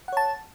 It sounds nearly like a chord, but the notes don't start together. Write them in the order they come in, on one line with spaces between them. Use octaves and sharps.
F#5 C#5 A5